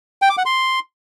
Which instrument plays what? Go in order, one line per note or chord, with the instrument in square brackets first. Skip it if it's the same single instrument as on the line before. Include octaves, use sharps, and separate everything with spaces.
[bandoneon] G5
D6
F#5
C6